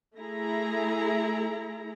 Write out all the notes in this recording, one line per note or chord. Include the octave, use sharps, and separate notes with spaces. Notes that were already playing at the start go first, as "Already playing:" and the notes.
A3 E4 G#4 A#5